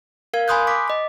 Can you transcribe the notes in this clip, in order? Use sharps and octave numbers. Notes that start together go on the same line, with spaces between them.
A#4 F5 G#6
G#5 B5 C6 D#6 F#6 G6
D6 B6
D#5 D6